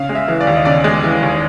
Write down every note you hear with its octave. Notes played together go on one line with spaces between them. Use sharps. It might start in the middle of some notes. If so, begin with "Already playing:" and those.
Already playing: C#3 F5
G#3
E5
E3
D5
D#2
D#5
C#3 D5
G#3
E3
D#2